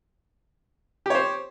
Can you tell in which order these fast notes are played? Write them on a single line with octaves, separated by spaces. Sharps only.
G4 C#5 C5